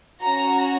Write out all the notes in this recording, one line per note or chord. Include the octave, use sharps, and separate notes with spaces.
C#4 F#4 A#5